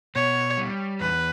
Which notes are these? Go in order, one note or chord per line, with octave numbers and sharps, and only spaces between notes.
B2 C#5
G3
E2 B4